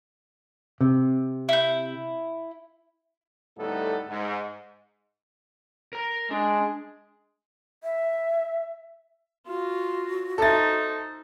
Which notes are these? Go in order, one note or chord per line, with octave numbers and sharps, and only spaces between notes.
C3
E4 G6
D2 A2 G3 B3 D#4 A4
G#2
A#4 A#5
G#3 D4
E5
F4 F#4
D#4 A4 C5 E5 A6